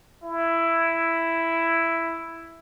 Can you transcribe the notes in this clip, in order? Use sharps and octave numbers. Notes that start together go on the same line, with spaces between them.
E4